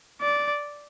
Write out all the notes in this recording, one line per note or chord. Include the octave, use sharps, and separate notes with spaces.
D5